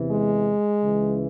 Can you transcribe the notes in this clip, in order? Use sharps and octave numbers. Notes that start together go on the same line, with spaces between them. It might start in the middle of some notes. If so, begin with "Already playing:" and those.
Already playing: E2 C3 E3
G#3
C#2 C#3 E3